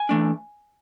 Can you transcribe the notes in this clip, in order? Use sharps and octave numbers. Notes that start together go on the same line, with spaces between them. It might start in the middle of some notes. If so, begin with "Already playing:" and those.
Already playing: G#5
E3 A3 D4